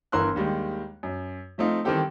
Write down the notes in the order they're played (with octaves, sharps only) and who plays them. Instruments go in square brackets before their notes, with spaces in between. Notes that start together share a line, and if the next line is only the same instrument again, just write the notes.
[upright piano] G1 E3 A#4 C6 E6 F#6
D#2 D#3 G3 G#3
F#2
F3 A3 C4 D#4 F4
D#3 E3 G3 C4 G4 A4